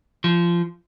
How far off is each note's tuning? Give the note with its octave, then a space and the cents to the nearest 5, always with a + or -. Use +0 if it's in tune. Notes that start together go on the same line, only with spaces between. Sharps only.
F3 -20